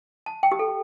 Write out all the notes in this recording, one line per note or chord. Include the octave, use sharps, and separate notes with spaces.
A5
G5
G4
A4